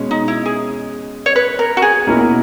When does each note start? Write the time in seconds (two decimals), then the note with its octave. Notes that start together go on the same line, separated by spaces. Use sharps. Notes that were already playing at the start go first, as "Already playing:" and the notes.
Already playing: B2 G#3 C#4
0.11 D#4
0.28 E4
0.46 G#4
1.26 C#5
1.36 B4
1.59 A#4
1.77 F#4
1.82 G#4
2.07 B2 A#3 C#4 E4 A#4